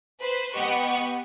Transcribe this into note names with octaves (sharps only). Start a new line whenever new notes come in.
B4 C5
B3 G4 D#5 F#5 C#6